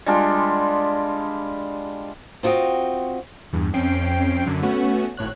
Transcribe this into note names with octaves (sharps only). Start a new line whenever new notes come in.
G3 G#3 D4 F4
C4 F4 F#4 D#5 G5
E2 G2
F2 C4 C#4 G5 C7 D7
F#2 D3 F#3 C#4
A3 B3 C#4 F#4
G#1 A2 C#5 F#6